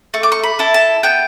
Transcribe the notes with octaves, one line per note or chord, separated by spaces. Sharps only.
A3 C#6
D6
C#6
B5
E4 A4
A5
B3 G5